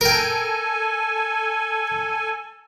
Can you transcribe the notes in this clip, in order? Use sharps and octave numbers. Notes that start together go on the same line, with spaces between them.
A4 A#4 G5 G#5